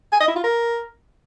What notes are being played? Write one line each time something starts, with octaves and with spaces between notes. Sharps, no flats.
G#5
D#5
E4
F4
A#4